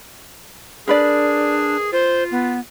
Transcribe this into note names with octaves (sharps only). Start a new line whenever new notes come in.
D4 G#4 A#4 B4 D5
F4 C5
B3